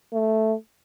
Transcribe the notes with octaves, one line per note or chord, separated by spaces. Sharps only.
A3